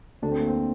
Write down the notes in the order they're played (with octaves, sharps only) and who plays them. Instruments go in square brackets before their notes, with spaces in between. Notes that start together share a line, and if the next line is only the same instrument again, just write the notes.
[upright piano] D2 [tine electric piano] D4
[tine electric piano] C4
A#3
C4